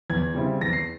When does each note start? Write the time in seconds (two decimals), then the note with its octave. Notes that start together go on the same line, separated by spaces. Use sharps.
0.10 E2 G#6
0.35 C#3 G3 C4 E4
0.61 E2 A#6
0.73 C7